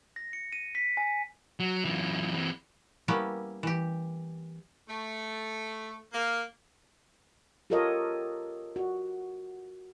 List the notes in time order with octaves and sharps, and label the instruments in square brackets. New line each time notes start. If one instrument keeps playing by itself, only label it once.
[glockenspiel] A#6
C#7
D#7
B6
G#5
[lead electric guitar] F#3
F#2 E3
E3 C4
[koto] G3 A#3 B3 C#4 E4
E3 G4
[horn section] A3
A#3
[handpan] F4 G4 A4 A#4 C#5 D#5
F#4